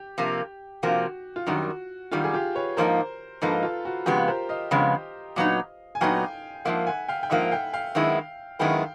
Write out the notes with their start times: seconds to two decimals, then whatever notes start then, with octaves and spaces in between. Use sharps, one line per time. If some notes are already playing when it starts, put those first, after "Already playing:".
Already playing: G4
0.18 C3 F3 A#3
0.83 C3 F3 A#3 F#4
1.36 F4
1.47 F#2 D#3 G3 F#4
2.11 F#2 D#3 G3 F4 G4
2.24 G#4
2.34 F4 G4
2.55 B4 C#5
2.77 G#2 F3 A#3 D#4 A#4 C5
3.42 G#2 F3 A#3 D#4 A4 B4
3.63 F4
3.85 F#4
4.06 F2 C#3 G#3 B3 F4 G4
4.28 A#4 C5
4.49 D#5 F5
4.71 F2 C#3 G#3 B3
5.36 A#2 F#3 B3 D#4
5.95 G#5
6.01 A#2 F#3 B3 D#4 F5 G5
6.65 G#2 F3 A#3 E5 F#5
6.87 F#5 G#5
7.08 F5 G5
7.23 G5
7.30 G#2 F3 A#3 E5 F#5
7.51 F5 G5
7.73 F5 G5
7.95 F#2 D#3 G#3 B3 E4
8.59 F#2 D#3 G#3 B3 E4 F5 G5